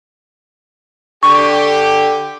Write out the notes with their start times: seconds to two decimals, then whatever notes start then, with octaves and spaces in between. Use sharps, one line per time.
1.23 D3 G4 C#6